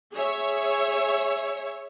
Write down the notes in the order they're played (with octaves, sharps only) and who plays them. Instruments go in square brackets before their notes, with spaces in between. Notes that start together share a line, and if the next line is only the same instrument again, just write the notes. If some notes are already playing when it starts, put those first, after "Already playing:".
[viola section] G#4 C#5 E5